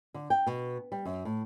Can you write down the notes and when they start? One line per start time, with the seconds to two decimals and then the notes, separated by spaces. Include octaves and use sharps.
0.14 D3
0.30 G5
0.47 B2
0.92 G3
1.05 F#2
1.25 A2